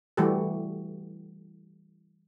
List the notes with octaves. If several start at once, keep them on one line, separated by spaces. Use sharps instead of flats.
E3 G3 A3 F#4 G4 A4